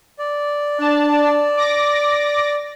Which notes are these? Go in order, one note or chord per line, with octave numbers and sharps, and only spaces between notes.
D5
D4 A5
D6 A#6